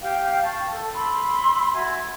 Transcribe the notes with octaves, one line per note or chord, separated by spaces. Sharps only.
G4 F5 G5
A5 C#6
A4
B5 C6 E6
F#4 E5 G#5